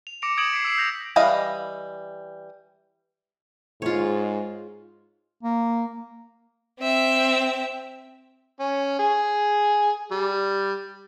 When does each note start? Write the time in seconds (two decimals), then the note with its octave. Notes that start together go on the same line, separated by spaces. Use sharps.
0.07 F7
0.22 D6 A#6 C#7 D7 F7
0.37 D6 D#6 G#6 D7 E7 F#7
0.53 B6 C7 D7
0.65 E6 B6 C7 D7
0.78 G6 A#6 F7
1.16 E3 G3 D#5 F5
3.82 G#2 F4 C#5
5.43 A#3
6.79 C4 E5
8.60 C#4
8.99 G#4
10.11 G3